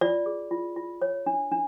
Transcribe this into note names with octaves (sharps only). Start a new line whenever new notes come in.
F4 D5
G#4
F4
F4
C#5
D4
D4